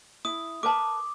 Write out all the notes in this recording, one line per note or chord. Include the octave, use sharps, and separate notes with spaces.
E4 D#6
A#4 B4 A5 D6